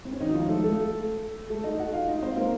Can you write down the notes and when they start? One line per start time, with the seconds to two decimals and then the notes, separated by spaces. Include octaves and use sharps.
0.05 C4
0.12 C#4
0.20 D#3 D#4
0.29 F#4
0.34 F3 F4
0.49 A3 A4
0.64 A3 A4
1.50 A3 A4
1.64 D#4 D#5
1.79 F#4 F#5
1.93 F4 F5
2.08 D#4 D#5
2.22 C4 C5
2.37 A#3 A#4